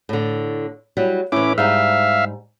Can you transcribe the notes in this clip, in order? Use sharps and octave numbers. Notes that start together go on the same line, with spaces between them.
A2 D3
F#3 G3 E4
A2 E3 C#4 E4 D6
G#2 G3 D#4 E5 F5